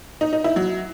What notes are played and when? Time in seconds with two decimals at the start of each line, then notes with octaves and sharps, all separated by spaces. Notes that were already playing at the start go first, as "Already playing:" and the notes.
0.21 D#4
0.33 D#4
0.44 E4
0.56 F#3